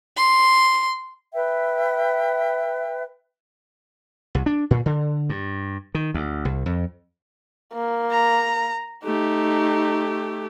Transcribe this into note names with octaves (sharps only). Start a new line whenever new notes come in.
C6
B4 E5 G5
C2
D4
A#2
D3
G2
D#3
D2
C2
F2
A#3
A#5
A3 D#4 G4